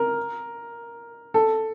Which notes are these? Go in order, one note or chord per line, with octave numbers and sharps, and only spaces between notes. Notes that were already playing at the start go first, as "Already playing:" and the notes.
Already playing: A#4
A4